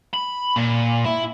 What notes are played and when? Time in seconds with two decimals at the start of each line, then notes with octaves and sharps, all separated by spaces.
0.13 B5
0.56 A#2
1.05 E4